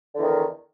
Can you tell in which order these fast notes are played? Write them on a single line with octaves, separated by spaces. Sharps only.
D3 E2 D#3